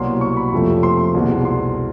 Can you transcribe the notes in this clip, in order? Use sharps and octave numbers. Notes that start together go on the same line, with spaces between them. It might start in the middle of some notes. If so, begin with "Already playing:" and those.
Already playing: C2 B2 F#3 A#3 C6
C#6
B5
F2 C3 F3 A3
C6
C2 B2 G#3
C6